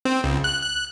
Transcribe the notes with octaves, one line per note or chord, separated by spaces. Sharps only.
C4
C#2
F#6
F#6